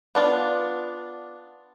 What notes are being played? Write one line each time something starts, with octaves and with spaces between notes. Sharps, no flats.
B3 D4 F4